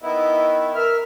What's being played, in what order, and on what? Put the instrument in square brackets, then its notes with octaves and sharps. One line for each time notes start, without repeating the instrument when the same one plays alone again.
[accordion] D#3 B3 E4 [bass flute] D#5
[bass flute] A#4 [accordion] E5 F6